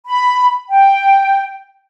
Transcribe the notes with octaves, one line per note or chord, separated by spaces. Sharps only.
B5
G5